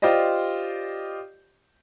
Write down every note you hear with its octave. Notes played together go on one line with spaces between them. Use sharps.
F4 G4 C5 D5 D#5